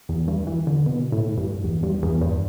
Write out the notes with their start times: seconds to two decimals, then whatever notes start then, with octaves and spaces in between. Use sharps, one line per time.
0.09 E2
0.28 G2
0.47 E3
0.67 D3
0.86 B2
1.12 A2
1.38 G2
1.64 E2
1.83 G2
2.03 E2
2.21 G2